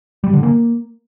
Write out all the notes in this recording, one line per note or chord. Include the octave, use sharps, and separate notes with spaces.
G3
D3
A#3